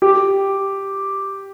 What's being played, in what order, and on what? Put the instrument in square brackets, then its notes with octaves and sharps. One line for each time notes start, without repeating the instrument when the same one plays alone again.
[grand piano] G4